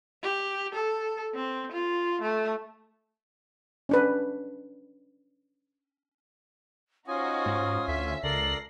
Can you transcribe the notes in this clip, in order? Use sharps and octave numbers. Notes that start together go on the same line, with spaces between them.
G4
A4
C4
F4
A3
C#4 D4 B4
C#4 D#4 F4 F#4 C5 G#5 D#6
G#2
D2 E5 B6
C#2 A4 A#4 D5 A#6 C7 F#7